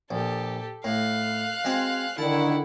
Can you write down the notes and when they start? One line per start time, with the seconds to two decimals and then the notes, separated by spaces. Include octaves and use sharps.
0.11 A#1 G4 A4
0.84 A2 F5 F#6
1.64 G#3 C4 F#4
2.18 D3 D#3 E4 F#5 A5